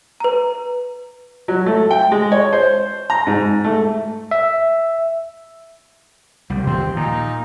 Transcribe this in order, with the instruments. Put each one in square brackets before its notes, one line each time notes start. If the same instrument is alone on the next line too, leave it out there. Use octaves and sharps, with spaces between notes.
[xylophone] B4 A#5
[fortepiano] F#3
A3
G5
G#3
C#5
C5
A#5
G#2
A3
[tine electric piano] E5
[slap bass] C2 G3
[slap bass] D#2 F3 [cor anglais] C4
[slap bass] A#2 [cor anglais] D#4